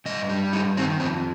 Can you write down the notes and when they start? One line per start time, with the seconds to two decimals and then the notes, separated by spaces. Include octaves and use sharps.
0.05 G2 D#5
0.29 G3
0.53 G2 D#4
0.77 D#3 C4
1.00 F2 C4